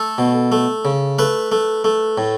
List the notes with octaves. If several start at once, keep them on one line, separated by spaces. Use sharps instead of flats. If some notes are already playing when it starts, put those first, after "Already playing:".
Already playing: A3 A4
B2
A3
C#3
A3 B4
A3
A3
A2